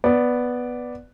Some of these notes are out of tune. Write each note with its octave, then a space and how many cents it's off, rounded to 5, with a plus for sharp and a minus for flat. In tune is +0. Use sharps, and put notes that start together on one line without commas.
B3 +0 D5 +0